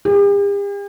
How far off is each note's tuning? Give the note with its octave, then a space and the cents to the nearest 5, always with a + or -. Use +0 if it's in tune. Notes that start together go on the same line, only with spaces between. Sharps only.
G4 +45